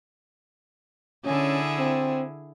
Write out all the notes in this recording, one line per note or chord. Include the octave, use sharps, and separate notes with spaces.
D3 C#4 E4 G#4
C4